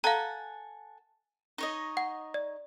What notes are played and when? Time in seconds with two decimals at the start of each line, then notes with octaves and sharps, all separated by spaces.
0.04 A4 F5 F#5 G#5 A#5
1.58 D#4 C#5 D#5
1.97 F#5
2.34 D5